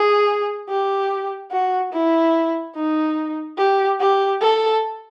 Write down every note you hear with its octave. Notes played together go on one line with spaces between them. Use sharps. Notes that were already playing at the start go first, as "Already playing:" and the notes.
Already playing: G#4
G4
F#4
E4
D#4
G4
G4
A4